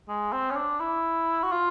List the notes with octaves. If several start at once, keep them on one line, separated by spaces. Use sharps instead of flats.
G#3
C4
C#4
D4
E4
F#4
F4